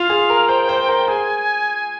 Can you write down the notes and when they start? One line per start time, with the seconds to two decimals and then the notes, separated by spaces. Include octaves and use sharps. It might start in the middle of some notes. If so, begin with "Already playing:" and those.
Already playing: F4 F5
0.10 G#4
0.30 A#4
0.48 C5 G5
0.69 C5
0.88 A#4
1.08 G#4 G#5